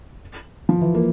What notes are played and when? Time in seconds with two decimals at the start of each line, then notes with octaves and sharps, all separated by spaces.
0.69 F3
0.81 E3
0.95 A#3